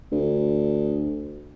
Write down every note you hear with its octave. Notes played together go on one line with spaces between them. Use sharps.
D2